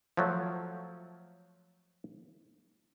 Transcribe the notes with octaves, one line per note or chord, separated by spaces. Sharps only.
F3 F#3 A3